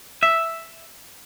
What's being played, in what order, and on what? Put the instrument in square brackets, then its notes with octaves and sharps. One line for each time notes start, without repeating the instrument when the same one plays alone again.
[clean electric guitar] E5